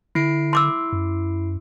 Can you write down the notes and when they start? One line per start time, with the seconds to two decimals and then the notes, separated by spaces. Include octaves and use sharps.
0.15 D3 E4 C7 D7
0.53 C6 D6 E6
0.93 F#2